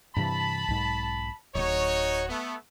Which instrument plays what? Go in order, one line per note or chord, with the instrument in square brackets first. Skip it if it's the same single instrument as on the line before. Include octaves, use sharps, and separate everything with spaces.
[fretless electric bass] G2 C3 E3 [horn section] A5 B5
[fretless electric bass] B1 G#2
[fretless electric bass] D1 [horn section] D#4 F#4 C#5
[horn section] A3 B3